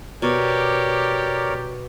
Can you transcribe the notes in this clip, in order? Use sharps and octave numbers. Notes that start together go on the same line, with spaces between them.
B2 G4 A#4 C#5 D5